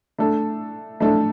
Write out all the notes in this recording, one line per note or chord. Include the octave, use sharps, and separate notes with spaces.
A3 D4 A4
A3 D4 A4